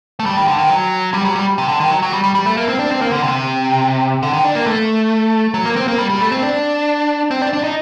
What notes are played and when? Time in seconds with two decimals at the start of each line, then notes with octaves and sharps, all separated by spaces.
0.19 A3
0.26 G3
0.37 D#3
0.48 D3
0.58 D#3
0.70 F#3
1.14 G3
1.25 F#3
1.35 G3
1.58 C3
1.68 D3
1.80 D#3
1.91 F#3
2.02 F#3
2.13 G3
2.24 G3
2.35 G3
2.46 A3
2.57 A#3
2.68 C4
2.79 D4
2.90 C4
3.01 A#3
3.12 D3
3.23 C3
4.23 D3
4.33 D#3
4.44 D4
4.55 A#3
4.67 A3
5.54 F#3
5.65 A#3
5.76 C4
5.88 A#3
5.98 G3
6.10 G3
6.21 A3
6.32 C4
6.43 D4
7.31 C4
7.42 D4
7.53 D4
7.64 D#4